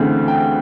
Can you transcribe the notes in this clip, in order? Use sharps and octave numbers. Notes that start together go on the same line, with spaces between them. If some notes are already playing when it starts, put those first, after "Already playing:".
Already playing: D2 C#3 E3 A3 C4
G5